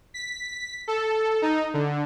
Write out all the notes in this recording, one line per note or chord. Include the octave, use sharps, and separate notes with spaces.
B6
A4
D#4
D3